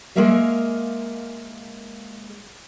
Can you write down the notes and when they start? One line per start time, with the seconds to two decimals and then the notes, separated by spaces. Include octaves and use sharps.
0.16 G#3 A#3 G#4 A#4 E5 F5